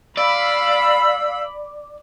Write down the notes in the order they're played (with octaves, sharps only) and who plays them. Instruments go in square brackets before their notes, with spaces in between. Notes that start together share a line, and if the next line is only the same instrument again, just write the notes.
[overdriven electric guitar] D5 [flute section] F5 E6 [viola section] B5